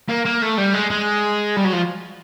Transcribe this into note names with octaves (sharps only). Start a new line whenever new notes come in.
A#3
A#3
A3
G3
G#3
G#3
G3
F#3
F3